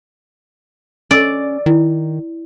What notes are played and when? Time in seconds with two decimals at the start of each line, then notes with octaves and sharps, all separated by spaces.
1.11 C#4 D5 D#5 E6
1.66 D#3 E4